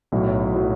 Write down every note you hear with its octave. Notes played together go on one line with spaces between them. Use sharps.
B1 A2 F#3
A2 F#3